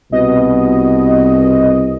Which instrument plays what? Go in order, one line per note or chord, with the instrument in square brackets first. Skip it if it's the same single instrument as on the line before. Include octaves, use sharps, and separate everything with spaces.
[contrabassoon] C2 [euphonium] B2 [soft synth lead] D#5